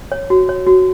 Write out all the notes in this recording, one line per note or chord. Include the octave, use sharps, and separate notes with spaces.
C#5
F#4
C#5
F#4